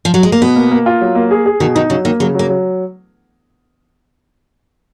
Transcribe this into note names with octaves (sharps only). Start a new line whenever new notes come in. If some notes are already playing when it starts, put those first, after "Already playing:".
F3
F#3
G#3
A#3
B2 B3
A#3
A#3
F4
F#3
A#3
G#4
G#4
B2 D#3
D#3 D#4
C#3 F#3
D#3 A#3
C#3 F#3
F#3 A#3
F#3